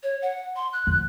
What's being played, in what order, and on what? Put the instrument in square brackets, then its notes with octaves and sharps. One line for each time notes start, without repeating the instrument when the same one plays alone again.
[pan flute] C#5
F#5
C6
F#6
[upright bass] F2